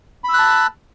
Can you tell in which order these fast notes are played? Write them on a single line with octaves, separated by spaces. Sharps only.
B5 E6 F#6 A5